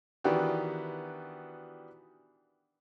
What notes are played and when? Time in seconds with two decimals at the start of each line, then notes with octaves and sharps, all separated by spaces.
0.24 D#3 E3 B3 D4 F#4 G4